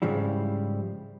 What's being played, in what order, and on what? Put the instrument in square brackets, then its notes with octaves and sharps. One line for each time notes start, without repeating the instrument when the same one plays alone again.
[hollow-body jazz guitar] G#2 C#3 F3 G3 E4